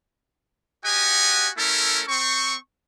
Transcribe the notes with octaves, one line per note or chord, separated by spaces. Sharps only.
F#4 G4 D#5 F#5 G#5
A3 C#4 E4 A4 A#4
C4 C#6